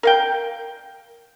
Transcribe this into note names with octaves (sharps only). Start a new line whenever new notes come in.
A#4 F5 G5